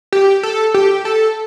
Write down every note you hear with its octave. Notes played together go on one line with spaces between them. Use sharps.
G4
A4
G4
A4